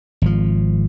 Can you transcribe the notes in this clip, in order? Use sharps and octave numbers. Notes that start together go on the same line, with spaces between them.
G#1 F3